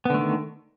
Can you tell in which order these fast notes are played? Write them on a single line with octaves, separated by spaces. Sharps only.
B3 D3 A3 D#3